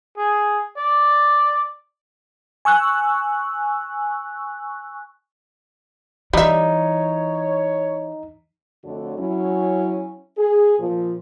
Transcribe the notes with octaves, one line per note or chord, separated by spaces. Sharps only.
G#4
D5
G#5 C#6 E6 F#6
E3 G3 D#4 C#5 E5
F2 D3 A3 F#4 A4 C#5
F#3 C#4 E4
G#4
A#2 F3